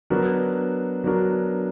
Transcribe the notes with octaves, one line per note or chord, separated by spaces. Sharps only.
F#3 B3 D4 F#4 A#4
F#3 B3 D4 F#4 A#4